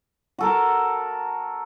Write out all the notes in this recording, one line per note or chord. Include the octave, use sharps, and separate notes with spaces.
F#4 A4 A#4